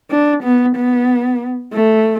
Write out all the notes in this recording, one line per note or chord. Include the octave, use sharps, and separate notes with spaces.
D4
B3
B3
A3